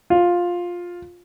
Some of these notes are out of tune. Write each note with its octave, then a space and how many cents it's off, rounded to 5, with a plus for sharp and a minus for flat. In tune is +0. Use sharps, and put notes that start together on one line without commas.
F4 +10